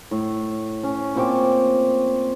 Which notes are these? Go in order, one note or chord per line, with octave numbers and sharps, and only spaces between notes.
A2
C#4
A#2 C4 C#6 D6